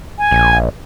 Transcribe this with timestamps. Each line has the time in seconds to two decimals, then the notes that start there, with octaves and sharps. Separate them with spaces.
0.18 G#5
0.31 A#1